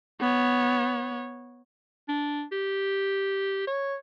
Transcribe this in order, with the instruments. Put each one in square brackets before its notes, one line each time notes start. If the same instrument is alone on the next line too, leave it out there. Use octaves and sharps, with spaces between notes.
[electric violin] B3 C#5
[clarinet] D4
G4
C#5